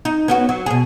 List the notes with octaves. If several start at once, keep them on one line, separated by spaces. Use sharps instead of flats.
D#4
B3 C#4 F#4
F#3
B2 G#4